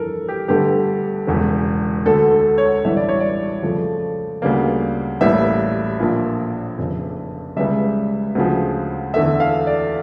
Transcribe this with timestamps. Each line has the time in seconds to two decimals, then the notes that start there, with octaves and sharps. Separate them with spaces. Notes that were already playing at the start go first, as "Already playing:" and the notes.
Already playing: G1 F2 E3 A4 A#4
0.28 G4
0.48 G1 G2 D3 A3 G4
1.27 E1 E2 C#3
2.06 D2 D3 A3 A4
2.58 C#5
2.85 A1 G2 E3 G3 E5
2.96 D5
3.09 C#5
3.20 D5
3.63 F2 C#3 F3 A3
4.42 D2 C#3 G3 A#3
5.21 A1 A2 G3 A#3 E5
5.99 A#1 A#2 F3 A#3
6.78 F1 F2 C#3
7.57 C#2 C#3 G3 E5
8.35 D2 C#3 F3
9.14 E2 D3 A3 E5
9.40 F5
9.67 D5